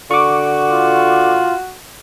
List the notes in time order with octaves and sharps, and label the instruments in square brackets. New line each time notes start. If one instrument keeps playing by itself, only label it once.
[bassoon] D3 [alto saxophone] F#4 [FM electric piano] C#6 D6
[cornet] F4